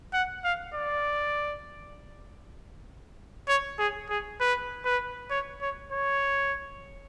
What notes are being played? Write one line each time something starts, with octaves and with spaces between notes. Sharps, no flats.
F#5
F5
D5
C#5
G#4
G#4
B4
B4
C#5
C#5
C#5